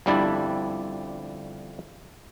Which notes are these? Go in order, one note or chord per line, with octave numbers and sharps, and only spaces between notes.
G1 F2 G3 D4 E4 D5